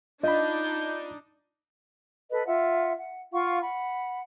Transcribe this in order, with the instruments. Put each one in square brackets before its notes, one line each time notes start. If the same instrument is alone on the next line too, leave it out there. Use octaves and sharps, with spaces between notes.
[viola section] D4 D#4 [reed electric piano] F4 B5 [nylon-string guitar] D#5 [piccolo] G6
[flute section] A4 B4 D#5
F4 E5 F#5
F#5
F4 F5 F#5 C#6
F#5 B5